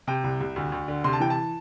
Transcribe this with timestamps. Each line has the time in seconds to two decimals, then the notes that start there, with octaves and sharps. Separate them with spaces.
0.07 C3 G5
0.24 C2
0.40 C2
0.56 D2
0.72 D2
0.88 D3
1.04 C3 C6
1.13 A5
1.20 E3 G5
1.30 A5